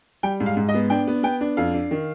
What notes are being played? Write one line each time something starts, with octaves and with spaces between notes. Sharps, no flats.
G3 G5
G#2
F5
G#2
D#5
B3
D4 G5
B3
B3 G5
D4
F2 F5
D4
D#3